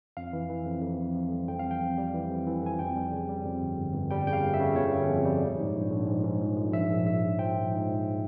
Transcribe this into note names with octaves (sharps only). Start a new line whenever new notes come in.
F2 F5
E3
E3
F2
F2
F2
F2
G3
F2 G5
F5
F2
G5
F2
G3
E3
F2
E3
F2 G#5
F2 G5
G3
C#3
G3
F2
G1
G1
G1
G3 G5
C#3 G5
F5
G1
E5
C#3
G1 C#5
C#3
F2
G3
A#1
G#2
A#1
A#1
G#2
G#2
F3
A#1
A#1 E5
A#1
A#1 E5
A#1
F3 G5
A#1
G#2
A#1